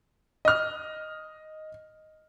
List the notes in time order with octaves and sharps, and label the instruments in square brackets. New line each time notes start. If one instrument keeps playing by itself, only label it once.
[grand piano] D#5 F6